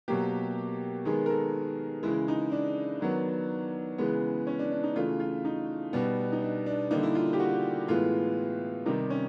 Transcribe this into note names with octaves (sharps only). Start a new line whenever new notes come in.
B2 F#3 A#3 G4
D#3 G#3 B3 G#4
A#4
A4
C#3 E3 G#3 E4
D#4
D4
D#3 F#3 B3
C#3 E3 G#3 B3
C#4
D4
D4
D#4
C#3 E3 A3 F4
F4
D#4
B2 G3 B3
D#4
D4
D4
D3 G3 A#3 D#4
E4
F4
G4
F#4
A2 E3 G#3 B3 F4
C3 D#3 G3 D#4
C#4